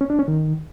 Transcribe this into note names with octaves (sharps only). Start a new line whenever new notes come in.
C#4
D4
C#4
D#3